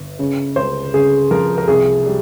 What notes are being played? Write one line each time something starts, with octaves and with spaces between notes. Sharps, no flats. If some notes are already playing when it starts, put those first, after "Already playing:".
Already playing: G1
C#3
C#2 C5
C#3 G#4
F3 A#4
A#4
C2 G#4
G3